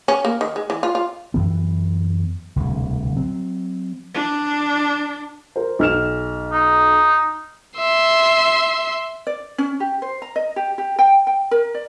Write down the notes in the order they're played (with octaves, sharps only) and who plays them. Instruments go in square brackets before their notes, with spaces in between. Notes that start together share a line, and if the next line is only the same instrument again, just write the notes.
[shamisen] C#4
A#3
D#3
G#3
E3
F4
F4
[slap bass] F#2 E3 B3
D1 C2 B2 D3
F#3 C4
[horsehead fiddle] D4
[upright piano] A#4 C5
B1 F6 E7
[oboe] D#4
[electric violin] E5 C6
[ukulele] D5
C#4
G4
C5
A#5
D#5
G4
G4
G5
G5
A#4
D5